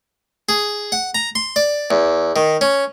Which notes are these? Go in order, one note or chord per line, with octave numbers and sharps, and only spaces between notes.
G#4
F#5
A#5
C6
D5
E2
D#3
C#4